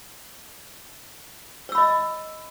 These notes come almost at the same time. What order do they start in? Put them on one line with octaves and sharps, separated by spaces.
C#5 E6 B5 D#5